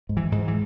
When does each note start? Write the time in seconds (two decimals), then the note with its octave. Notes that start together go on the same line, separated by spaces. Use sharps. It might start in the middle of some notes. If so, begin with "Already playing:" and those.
0.09 G#2
0.17 E3
0.32 G#2
0.48 E3